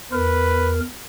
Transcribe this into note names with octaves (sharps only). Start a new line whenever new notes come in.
E2 A#4 B4